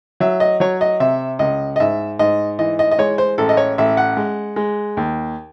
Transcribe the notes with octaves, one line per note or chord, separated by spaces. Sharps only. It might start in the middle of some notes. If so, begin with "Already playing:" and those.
F#3 E5
D#5
F#3 C#5
D#5
C3 E5
C#2 D#5
D#5
G#2 E5
G#2 D#5
E3 D#5
D#5
D#5
G#3 C#5
C5
A1 A4
D#5
C#5
A1 E5
F#5
G#3
G#3
D#2